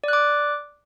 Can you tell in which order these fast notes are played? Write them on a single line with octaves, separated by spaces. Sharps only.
D5 F#6 D6